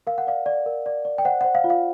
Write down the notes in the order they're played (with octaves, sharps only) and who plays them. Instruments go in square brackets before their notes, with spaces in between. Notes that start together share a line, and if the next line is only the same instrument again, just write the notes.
[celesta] A#4 F5
F#5
D5 F5
D5
A#4
D5
D5
G5
C5 F#5
C5 F#5
F5
F4
F5